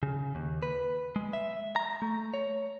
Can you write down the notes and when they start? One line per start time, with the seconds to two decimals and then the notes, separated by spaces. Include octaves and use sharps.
0.03 C#3
0.35 D#2
0.62 B4
1.16 G#3
1.33 E5
1.76 A#5
2.02 A3
2.34 C#5